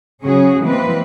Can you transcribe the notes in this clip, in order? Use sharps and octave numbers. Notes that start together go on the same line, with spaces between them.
C#3 F#3 C#4 F#4 G#4
E3 G#3 A#3 C4 B4